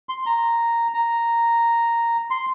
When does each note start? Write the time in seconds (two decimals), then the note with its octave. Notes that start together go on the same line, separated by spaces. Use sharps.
0.09 C6
0.26 A#5
0.94 A#5
2.30 C6